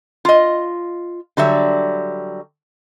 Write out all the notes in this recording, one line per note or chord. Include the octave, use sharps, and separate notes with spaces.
F4 D#5
D3 F#3 G3 E5